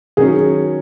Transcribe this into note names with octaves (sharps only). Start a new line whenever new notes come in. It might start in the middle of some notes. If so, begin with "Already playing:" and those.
D#3 F#3 C#4 G#4